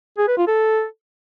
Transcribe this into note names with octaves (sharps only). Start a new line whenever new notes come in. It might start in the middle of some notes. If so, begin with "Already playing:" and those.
G#4
B4
F4
A4